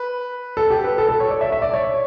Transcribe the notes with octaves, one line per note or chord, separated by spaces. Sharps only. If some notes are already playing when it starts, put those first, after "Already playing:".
Already playing: B4
A4
G4
B4
A4
A4
C#5
D5
E5
E5
D5
C#5